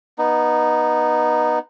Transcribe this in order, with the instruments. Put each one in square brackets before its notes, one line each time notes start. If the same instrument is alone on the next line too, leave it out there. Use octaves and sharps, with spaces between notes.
[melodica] B3 D#4